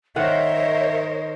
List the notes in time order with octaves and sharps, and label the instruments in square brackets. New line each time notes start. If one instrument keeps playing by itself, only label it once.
[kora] D#3 F#5 [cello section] A#4 C5 C#5 [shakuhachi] D#5 [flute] E5